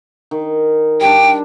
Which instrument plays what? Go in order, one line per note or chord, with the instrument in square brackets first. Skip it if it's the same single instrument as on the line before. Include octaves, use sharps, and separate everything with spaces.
[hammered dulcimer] D#3
[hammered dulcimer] G3 D4 [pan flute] G5